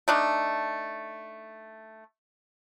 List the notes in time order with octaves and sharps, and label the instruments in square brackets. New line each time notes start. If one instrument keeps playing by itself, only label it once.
[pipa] A3 D4 D#4